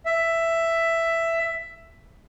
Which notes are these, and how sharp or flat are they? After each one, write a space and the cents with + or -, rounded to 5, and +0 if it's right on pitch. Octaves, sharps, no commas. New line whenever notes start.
E5 +10